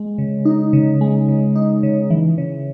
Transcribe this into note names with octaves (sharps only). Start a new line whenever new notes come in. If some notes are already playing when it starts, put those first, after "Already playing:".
Already playing: G#3
C#3
D#4
C#3
G#3
C#3
D#4
C#3
E3
C#3